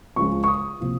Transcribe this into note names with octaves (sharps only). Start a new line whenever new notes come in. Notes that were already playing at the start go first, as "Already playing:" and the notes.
C#2 C#3 F3 G#3 C#6
C#6
D#6
C3 F3 A#3